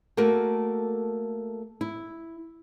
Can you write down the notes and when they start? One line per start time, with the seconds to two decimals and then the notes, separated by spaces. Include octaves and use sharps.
0.17 A3 A#3 F#4 A4 A#4
1.81 E4